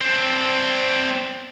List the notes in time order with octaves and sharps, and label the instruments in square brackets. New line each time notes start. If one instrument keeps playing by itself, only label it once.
[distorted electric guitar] C4 D4